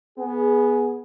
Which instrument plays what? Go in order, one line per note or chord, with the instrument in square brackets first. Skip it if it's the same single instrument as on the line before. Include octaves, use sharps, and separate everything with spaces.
[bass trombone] B3 [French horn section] G#4